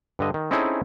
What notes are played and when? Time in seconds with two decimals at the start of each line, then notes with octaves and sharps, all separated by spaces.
0.19 G2 D3 D#5
0.34 D#3
0.51 C4 C#4 D#4 E4 G#4 A4